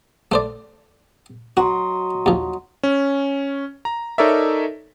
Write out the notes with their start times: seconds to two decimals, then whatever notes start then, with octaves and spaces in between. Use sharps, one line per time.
0.32 A3 C5 D5
1.57 F#3 F#4 D#5 C6
2.26 D#2 F3
2.83 C#4
3.85 A#5
4.18 D#4 A4 A#4 C#5 D5 E5